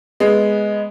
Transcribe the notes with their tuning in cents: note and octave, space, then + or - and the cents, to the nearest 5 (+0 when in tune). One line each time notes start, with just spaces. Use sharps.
G#3 +0 B3 +0